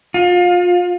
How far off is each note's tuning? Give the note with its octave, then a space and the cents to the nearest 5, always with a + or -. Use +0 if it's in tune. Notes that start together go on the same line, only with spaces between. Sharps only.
F4 +30